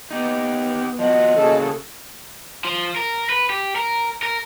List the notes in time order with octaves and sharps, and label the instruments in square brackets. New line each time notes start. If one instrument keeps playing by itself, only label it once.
[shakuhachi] B3 [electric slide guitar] D#4 G4
[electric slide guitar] F3 F#4 [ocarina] D#5
[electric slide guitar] A2 C#3 [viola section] A#3 F#4 A4 [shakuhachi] G#4
[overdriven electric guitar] F3
A#4
B4
G4
A#4
A#4